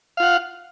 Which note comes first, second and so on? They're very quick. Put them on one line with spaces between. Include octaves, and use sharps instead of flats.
F5 F4 F#5